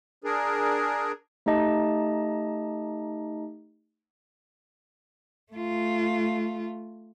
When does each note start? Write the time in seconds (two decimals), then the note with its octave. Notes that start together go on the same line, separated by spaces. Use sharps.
0.24 D4 G#4 A#4
1.46 A3 D#4 G4 D#5 A5 A#5
5.52 A3 F4